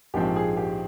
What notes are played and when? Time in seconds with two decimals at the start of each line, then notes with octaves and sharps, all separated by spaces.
0.14 A#1 G#2 F3 C4 G4
0.36 G#4
0.57 G4